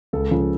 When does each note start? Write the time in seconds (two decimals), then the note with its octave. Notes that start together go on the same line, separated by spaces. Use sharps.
0.13 C#2 A4
0.31 C#3 F3